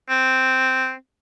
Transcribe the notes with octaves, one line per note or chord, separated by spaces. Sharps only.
C4